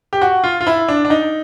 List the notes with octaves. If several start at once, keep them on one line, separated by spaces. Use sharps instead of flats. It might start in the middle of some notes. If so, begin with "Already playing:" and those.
G4
F#4
F4
F4
E4
D4
D4
D#4